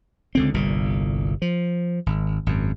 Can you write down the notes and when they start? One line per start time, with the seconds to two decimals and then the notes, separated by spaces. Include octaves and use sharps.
0.35 C#2 D3 C4
0.54 G1 C2 A#2
1.42 F3
2.06 G#1
2.46 G#1 F#2